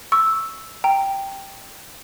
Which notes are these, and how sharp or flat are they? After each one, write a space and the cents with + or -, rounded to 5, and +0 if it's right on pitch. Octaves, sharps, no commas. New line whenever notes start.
C#6 +0 E6 +0
G5 +0 A#5 -15